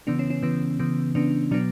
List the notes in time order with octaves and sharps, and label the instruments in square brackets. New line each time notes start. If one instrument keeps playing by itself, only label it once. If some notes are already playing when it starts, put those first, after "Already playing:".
[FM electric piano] C#3 E3 B3 D4
C#4
C#4
C#3 E3 B3
C#3 E3 B3
C#3 E3 B3 D4
B2 F#3 B3 D4